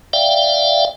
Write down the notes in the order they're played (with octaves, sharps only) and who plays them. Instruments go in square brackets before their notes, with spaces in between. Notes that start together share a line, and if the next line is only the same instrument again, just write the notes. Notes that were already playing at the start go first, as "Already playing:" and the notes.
[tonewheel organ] D5 E5 F5 G5